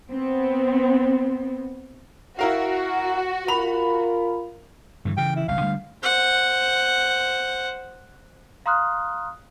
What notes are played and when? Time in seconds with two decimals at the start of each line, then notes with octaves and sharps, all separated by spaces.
0.11 B3 C4
2.39 E4 F#4 A#4 F5
3.48 F4 A#4 B5 F7
5.05 G2 D3 E3
5.17 C#3 E3 G5
5.36 E4
5.48 F#1 C2 F#2 F5
5.61 D3 G3 A3
6.03 C5 F#5
8.66 F5 A#5 C6 D#6 F6 F#6